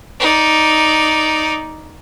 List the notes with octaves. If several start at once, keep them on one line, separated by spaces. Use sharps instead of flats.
D#4 D5